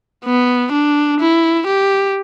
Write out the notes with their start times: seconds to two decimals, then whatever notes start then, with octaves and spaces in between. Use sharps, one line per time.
0.25 B3
0.72 D4
1.20 E4
1.66 G4